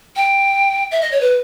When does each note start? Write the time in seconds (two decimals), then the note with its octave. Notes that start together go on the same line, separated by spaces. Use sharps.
0.16 G5
0.91 E5
1.01 D#5
1.11 C#5
1.21 B4